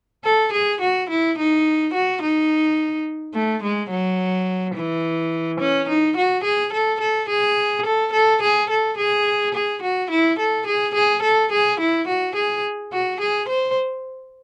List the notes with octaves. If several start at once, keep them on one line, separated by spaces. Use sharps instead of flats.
A4
G#4
F#4
E4
D#4
F#4
D#4
A3
G#3
F#3
E3
C#4
D#4
F#4
G#4
A4
A4
G#4
A4
A4
G#4
A4
G#4
G#4
F#4
E4
A4
G#4
G#4
A4
G#4
E4
F#4
G#4
F#4
G#4
C5